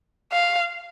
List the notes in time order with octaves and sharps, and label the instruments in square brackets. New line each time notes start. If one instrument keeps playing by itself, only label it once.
[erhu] F5